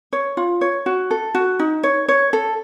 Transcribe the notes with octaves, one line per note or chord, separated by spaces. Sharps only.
C#5
F4
C#5
F#4
A4
F#4
D#4
C#5
C#5
A4